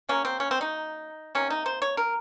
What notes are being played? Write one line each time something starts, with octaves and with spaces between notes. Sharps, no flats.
C#3 F#3 A#3 C#4
C4
C#4
C4
D#4
C3 D#3 A#3 C#4
D#4
C5
C#5
A#4